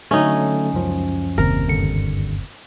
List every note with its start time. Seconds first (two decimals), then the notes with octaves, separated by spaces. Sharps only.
0.11 D3 F#3 A3 C#4 D#4
0.73 C#2 F#2 F3
1.38 F#1 D#2 C3 A#4
1.68 G2 D3 C#7